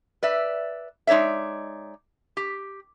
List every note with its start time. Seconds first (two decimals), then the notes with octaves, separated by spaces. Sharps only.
0.23 B4 D5 E5
1.07 G#3 D#4 C#5 D5 E5
2.37 G4